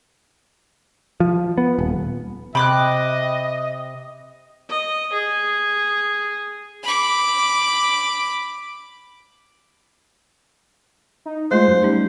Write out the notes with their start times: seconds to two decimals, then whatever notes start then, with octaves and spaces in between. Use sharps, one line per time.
1.20 F3
1.58 B3
1.79 D#1
2.55 C3 D#5 G5 B5 D6 F#6
4.69 D#5
5.13 G#4
6.83 B5 D6
11.26 D#4
11.51 G#3 A3 F4 C5
11.68 F#2
11.83 G3 C#4 D#4